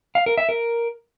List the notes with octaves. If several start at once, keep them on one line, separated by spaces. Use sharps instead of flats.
F5
A#4
E5
A#4